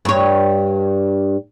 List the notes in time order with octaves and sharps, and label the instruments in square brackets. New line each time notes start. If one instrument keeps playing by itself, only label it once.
[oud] G2 C#5